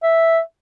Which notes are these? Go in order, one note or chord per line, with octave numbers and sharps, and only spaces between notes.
E5